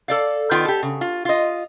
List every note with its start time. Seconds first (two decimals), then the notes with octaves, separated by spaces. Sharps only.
0.08 A4 D5 F5
0.51 D#3 B3 F4 G5
0.65 G4 A4
0.83 C#3
1.01 F4
1.25 F4 D#5